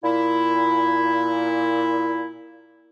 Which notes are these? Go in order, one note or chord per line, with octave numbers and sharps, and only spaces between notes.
A#2 E4